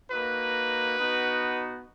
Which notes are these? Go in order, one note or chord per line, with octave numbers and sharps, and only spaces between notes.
A#3 D#4 F#4 B4
B3 D#4 F#4